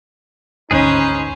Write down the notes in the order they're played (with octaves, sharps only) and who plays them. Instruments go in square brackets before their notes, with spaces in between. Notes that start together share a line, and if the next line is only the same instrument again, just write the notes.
[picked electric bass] G#1 D2 [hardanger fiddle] C#4 [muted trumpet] D#4 [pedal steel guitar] G#4 B4 C5